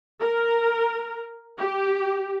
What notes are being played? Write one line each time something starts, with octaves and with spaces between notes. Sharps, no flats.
A#4
G4